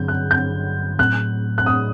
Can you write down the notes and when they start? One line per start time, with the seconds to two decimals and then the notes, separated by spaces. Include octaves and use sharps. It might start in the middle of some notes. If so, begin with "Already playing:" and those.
Already playing: G2 D3 F#3 C4 G6
0.08 F#6
0.31 G6
0.99 A2 F#3 C4 F#6
1.58 F#6
1.66 D#6